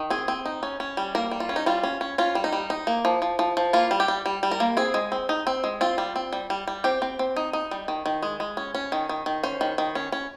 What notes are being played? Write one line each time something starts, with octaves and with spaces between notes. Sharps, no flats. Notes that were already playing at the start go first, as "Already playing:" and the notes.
Already playing: D#3
C4 G#4
C4
D#4
C#4
C#4
G3
A#3 A#4
G3
F4
C#4
D#4
G3 F4
C#4
C#4
C#4 F4
G3
D#4
G3
D#4
A#3
F3
F3
F3
F3
A#3 F4
G3
G4
G3
G3
G3
A#4
A#3
C4 G#4
G#3
C4
D#4
C4
G#3
C4 F4
G3
C4
G3
G3
G3
C4 G4
C4
C4
D#4
D#4
G3
D#3
D#3
G#3
G#3
C#4
C#4
D#3
D#3
D#3
C#4 C5
D#3
D#3
C#4
C#4